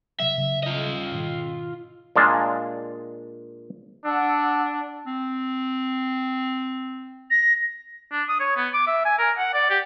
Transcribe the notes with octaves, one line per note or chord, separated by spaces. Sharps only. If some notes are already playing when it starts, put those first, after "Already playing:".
C3 F#3 E5
C#3 F#3
F4 D#5
G#2 B2 D#3
A#2 G#3 D4 F5 A5
D4 F#5 A5 E6
C4
A#6
D4
D#6
C#5
B3
D6
E5
G#5
A#4
F#5
D5
G4